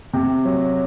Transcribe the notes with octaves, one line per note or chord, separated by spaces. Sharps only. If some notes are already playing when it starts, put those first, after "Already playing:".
C3
F#3